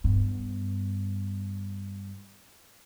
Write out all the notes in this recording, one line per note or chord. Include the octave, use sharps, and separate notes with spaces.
G2 B3